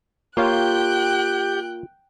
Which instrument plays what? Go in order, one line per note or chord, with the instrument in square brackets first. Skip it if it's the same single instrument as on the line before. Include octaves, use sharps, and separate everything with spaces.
[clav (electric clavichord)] A#3 C#5 F5 [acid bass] F4 [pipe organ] G4 G6 [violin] G5 F#6